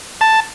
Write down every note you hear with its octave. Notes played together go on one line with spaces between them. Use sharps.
A5